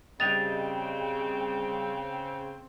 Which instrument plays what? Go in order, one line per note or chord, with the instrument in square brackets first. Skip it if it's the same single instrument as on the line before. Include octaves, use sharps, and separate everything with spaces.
[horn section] C#3 C4 [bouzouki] G3 D4 D#5 [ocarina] G5 [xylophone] A6 F7